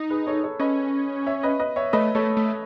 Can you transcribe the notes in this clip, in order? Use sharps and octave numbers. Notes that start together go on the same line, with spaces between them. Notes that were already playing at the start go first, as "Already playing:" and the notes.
Already playing: D#4
G#4 B4
A4 C#5
A4 C#5
C#4 B4 D#5
C#5 E5
B4 D#5
B4 D#5
C#5 E5
A3 B4 D#5
A3 A4 C#5
A3